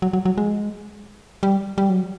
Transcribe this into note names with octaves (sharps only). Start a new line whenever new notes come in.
F#3
F#3
F#3
G#3
G3
G3
F#3